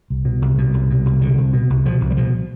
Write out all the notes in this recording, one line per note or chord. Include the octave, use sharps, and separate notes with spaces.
C2
B2
C2
B2
C2
B2
C2
B2 D3
C2
B2
C2
B2 F3
C2
G3
B2 F3